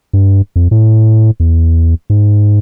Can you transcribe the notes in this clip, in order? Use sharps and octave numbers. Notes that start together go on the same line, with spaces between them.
G2
F2
A2
E2
G#2